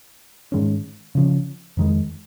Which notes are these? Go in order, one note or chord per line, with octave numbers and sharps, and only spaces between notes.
G#2 D#3 G#3 C#4
C#3 F3 C#4
F2 D#3 G#3